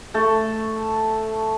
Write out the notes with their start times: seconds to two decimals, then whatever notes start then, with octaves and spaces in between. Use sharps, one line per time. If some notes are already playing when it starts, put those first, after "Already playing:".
0.14 A3 A4